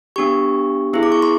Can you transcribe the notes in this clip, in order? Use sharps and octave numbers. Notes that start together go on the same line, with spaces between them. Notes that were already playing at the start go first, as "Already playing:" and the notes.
B3 D4 G4 C#6
B3 E4 G#4
D6
C#6
C6